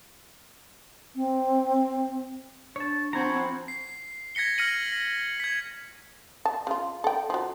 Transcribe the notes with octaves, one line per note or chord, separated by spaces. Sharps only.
C4
D4 C#5 A5
F3 C4 F#4 A4 F#5 G#5 A#5 B5
C7
G#6 A#6 B6 C#7 G7
F6 A#6 C#7 D#7 F#7
A#6
G#6 B6
A5
C#3 F4
A4 G5
F3 F#4